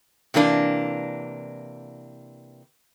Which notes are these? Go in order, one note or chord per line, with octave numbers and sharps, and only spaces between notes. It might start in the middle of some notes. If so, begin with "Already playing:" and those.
C3 E3 A#3 D4